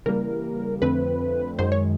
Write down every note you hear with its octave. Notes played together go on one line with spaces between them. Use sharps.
C#3 E3 G3 A#3 A#4
F2 D3 F3 A3 C4 B4
F#2 D#3 G#3 C5
C#5